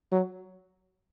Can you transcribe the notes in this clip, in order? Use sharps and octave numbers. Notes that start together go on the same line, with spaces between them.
F#3